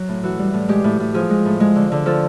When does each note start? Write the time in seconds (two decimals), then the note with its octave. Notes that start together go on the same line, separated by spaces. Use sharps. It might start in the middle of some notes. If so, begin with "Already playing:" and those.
Already playing: F#3
0.09 A2
0.23 E3 F#4
0.39 G3
0.54 A2
0.69 G#3 G4
0.84 A2
1.00 A2
1.14 F3 G#4
1.30 G#3
1.45 A2
1.60 G#3
1.76 D3
1.92 D3
2.06 F3 A4